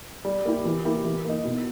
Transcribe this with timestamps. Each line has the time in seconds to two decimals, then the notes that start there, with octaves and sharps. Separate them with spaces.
0.25 G3
0.45 A#3 E4 G4
0.65 E3
0.85 A#3 E4 G4
1.05 E3
1.25 A#3 D#4
1.44 B2